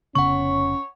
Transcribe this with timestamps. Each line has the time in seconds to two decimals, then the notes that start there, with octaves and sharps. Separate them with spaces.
0.15 F1 C#3 B3 C#4 C#5 F#5 C#6